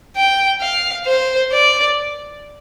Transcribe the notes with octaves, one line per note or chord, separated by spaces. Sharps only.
G5
F5
C5
D5